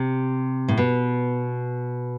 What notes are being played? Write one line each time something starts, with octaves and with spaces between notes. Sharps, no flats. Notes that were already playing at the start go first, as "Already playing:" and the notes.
Already playing: C3
A2
B2